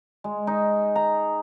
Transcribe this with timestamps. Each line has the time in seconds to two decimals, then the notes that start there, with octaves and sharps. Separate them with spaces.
0.24 G#3
0.47 D#4
0.96 A#5